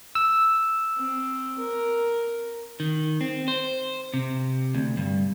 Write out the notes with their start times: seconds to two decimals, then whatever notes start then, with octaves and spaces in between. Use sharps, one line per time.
0.15 E6
0.97 C4
1.59 A#4
2.80 D#3
3.21 C4
3.48 C5
4.14 C3
4.74 D2
4.97 G2